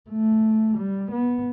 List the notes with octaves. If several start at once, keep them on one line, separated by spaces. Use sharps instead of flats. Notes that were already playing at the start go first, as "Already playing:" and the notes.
A3
G3
B3